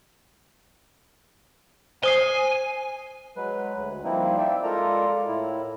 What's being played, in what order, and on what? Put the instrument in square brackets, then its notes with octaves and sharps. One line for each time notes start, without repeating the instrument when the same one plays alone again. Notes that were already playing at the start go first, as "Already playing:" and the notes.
[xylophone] C5 D#6 C7 [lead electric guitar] G#5
[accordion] F#3 G#3 B4
D2
F3 G3 A#3 C4 D#4 E4
D5 E5 G5
G#3 F4 A4 A#4 D5 A#5
A2 E4